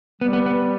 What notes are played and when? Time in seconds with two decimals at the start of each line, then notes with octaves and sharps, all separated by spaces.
0.21 G3 B3
0.33 B3
0.46 B3